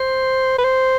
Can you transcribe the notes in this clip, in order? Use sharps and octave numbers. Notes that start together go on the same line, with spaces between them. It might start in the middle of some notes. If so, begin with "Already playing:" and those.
Already playing: C5
B4
C5